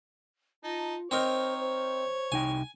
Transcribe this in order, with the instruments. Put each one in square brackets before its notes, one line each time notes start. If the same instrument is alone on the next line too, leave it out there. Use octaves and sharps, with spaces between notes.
[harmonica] D#4 A5 [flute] F4
[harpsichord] C4 D#4 A#4 [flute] C5 [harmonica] C#5
[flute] C5
[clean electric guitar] C2 D#4 G5 [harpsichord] G#5